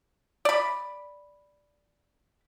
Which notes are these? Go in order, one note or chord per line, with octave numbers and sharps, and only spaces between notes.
D5 B5